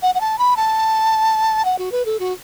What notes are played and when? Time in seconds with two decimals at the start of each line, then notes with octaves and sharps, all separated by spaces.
0.02 F#5
0.15 F#5
0.21 A5
0.39 B5
0.57 A5
1.65 F#5
1.79 F#4
1.92 B4
2.05 A4
2.19 F#4